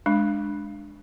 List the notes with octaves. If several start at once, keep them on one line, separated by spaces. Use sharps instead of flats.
G#3 D4